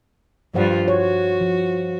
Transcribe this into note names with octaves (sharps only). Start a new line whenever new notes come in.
G2 F3 G3 F4 C5 F#5
F#4 C#5
F3